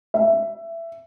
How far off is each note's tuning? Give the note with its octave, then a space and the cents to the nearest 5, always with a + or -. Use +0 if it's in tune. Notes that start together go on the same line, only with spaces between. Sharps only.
E5 +15